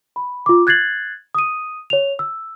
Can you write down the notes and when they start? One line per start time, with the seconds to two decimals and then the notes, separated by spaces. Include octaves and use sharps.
0.16 B5
0.46 F4 D6
0.67 F#6 G#6 A6 C7 F#7
1.35 D#6 D#7
1.90 C#5 F7
2.19 E6